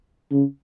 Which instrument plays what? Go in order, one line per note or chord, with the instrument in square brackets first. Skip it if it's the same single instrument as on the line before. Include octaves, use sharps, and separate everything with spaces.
[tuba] C#3